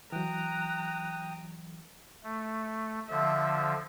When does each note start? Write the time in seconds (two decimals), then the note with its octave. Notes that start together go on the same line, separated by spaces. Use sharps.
0.12 E3 F#3 G5 A#5 D#6 F#6
2.23 A3
3.10 D3 F3 E5